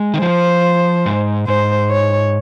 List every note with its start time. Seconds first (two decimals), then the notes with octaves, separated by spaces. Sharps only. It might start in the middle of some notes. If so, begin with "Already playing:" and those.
Already playing: G#3
0.14 D#3
0.22 F3 C5
1.06 G#2
1.47 G#2 C5
1.90 C#5